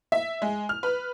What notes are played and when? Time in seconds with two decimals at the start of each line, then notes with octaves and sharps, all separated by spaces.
0.12 E5
0.42 G#3
0.69 F6
0.83 B4